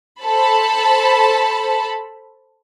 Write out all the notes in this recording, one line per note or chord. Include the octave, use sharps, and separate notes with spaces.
A4 C5 A5 B5